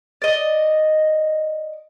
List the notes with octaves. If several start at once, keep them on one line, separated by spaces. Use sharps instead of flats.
D5 D#5